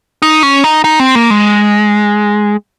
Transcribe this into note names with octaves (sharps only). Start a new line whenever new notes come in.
D#4
C#4
D#4
D#4
C4
A#3
G#3